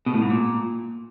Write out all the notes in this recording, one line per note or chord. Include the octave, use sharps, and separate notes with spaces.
B2
A2
G#2
A#2